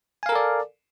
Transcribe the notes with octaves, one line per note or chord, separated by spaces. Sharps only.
A4 A#4 D5 F5 G#5